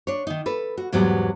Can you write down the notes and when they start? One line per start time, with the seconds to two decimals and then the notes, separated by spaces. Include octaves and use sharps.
0.07 D4 C#5
0.27 D#3 D#4
0.46 A4 B4
0.77 F#4
0.92 E2 G#2 F#3 G3 B3